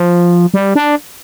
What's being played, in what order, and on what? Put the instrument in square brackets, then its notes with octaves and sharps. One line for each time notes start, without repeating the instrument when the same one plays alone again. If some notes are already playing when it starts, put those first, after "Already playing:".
Already playing: [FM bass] F3
G3
D4